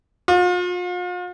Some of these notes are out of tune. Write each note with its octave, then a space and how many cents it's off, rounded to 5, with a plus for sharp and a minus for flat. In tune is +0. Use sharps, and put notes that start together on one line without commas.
F4 +40